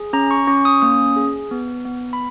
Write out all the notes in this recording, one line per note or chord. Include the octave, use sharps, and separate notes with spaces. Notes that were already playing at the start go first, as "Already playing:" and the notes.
Already playing: G#4
C#4 A#5
C#6
C#4 C#6
D#6
A#3 D#6
G#4
B3
B3
B5